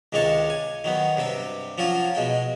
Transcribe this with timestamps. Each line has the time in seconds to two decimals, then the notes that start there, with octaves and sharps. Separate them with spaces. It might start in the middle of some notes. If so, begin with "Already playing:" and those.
0.13 C#2 C3 D#3 G#3 C#5 A5
0.50 G#5
0.84 D#3 F#3 B3
1.17 G2 C3 C4 G5
1.78 F3 F#3 C#4 F4 F#4
2.15 B2 G#3 G5